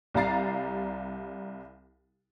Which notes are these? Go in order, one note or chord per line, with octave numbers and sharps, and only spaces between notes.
C2 G3 F5 A#5 A6 C7